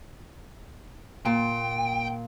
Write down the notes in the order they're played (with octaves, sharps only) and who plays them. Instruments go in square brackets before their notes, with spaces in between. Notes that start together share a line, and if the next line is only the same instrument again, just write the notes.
[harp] A#2 [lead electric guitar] G5